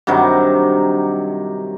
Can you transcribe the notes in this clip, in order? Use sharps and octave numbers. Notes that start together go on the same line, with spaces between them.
G2 C3 D#3 F#3